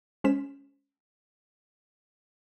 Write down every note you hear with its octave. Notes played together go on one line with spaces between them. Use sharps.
G#3 C#4 C5 B6 E7